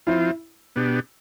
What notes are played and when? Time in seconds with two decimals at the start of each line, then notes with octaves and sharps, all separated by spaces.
0.07 F3 C4 E4 F4
0.76 B2 B3 D4 G4